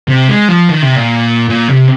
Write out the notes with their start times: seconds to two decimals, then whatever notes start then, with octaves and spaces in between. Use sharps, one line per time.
0.08 C3
0.28 G#3
0.48 F3
0.69 D#3
0.82 C3
0.96 A#2
1.49 A#2
1.69 C3